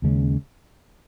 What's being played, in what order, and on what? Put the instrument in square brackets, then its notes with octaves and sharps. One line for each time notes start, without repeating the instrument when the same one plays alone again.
[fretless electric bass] D#2 C#3 G#3 C#4